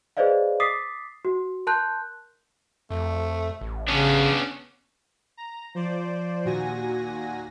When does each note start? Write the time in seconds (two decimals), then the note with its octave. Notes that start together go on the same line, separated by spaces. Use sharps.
0.17 G#4 B4 C5 D5 D#5 F5
0.60 D6 D#6 A6 B6 C7
1.25 F#4
1.67 A#4 A5 C6 F#6 G6
2.90 F2 A3
3.61 A1
3.88 C#3 B3 C#4 D4
5.37 A#5
5.75 F3 C5 D5
6.44 D#2 A#2 F#4 G#5 A#6